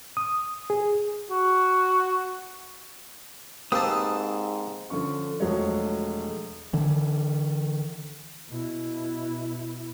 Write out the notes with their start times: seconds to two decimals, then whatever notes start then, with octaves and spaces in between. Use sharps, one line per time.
0.17 D#6
0.70 G#4
1.30 F#4
3.72 G#2 A#3 C4 G4 B4 A5 D#6 E6
4.90 D3 F3 C#4 C#6
5.40 E1 F3 F#3 G#3 A3 C#5
6.73 D3 E3
8.49 B2 E4